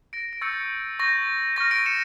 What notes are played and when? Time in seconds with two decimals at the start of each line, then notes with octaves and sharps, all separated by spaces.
0.13 A#6 D7
0.33 D7
0.41 C#6 E6 G6 A6 C#7
1.00 C#6 G6 A#6
1.56 C#6 F6 A#6
1.71 A#6 D7
1.86 C#7 E7